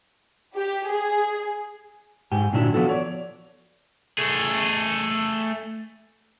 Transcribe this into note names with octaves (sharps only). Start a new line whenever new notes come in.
G4
G#4
G#2 G4 G#5
A#2 D3 D#3 F#3 D4 E4
F3 B3 F#4 A4
C#5 D5
A3 G#4